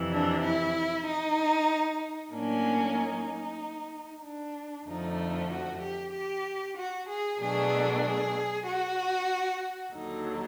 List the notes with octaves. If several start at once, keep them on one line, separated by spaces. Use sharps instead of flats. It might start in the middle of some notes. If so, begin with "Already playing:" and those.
Already playing: F2 C3 E3
D4
E4
D#4
A2 F#3 A#3 C#4 D4
D#4
D4
F2 D3 F3 A3 D#4
F#4
G4
G4
F#4
G#4
B2 F#3 A3 D4 G#4
G#4
F#4
D#2 D3 F#3 D#4